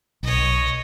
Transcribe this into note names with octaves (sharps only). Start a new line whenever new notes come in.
B1 C#5 D#5